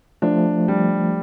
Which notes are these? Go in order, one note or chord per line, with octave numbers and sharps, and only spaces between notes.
F3 A3 D4
G3